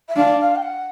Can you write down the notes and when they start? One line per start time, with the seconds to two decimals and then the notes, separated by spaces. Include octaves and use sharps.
0.08 E5
0.16 D4 F5
0.40 F5
0.55 G5
0.62 F#5